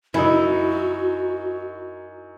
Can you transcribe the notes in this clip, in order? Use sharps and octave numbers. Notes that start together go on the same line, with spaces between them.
F#2 D#4 E4 F#4